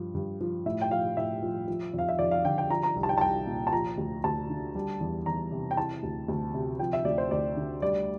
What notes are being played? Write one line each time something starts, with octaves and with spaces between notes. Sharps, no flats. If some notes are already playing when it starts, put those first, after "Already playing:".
Already playing: G2 F3
G2
F3
A2 E5
G5
F3 F5
A2 E5
F3
F3
F2 F5
E5
F2 D5
F5
D3 G5
G5
F3 A#5
A#5
C2
A5
G5
A5
C2 G5
A#2
A5
F3 A#5
D2
D2 A5
D3
G3
E2
E2 A#5
C3
G5
E3 A5
D2
D2
C3
F3 G5
E5
D2 D5
C5
D2 D5
D3
G3 D5